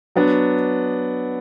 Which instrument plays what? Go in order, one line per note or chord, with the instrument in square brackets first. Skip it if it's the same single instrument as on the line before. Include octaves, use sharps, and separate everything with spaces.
[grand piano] F#3 B3 D4